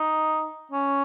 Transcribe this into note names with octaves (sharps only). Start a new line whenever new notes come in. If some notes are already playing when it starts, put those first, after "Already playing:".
Already playing: D#4
C#4